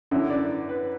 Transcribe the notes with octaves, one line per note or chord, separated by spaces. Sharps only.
F#2 D3 E4
D5
B4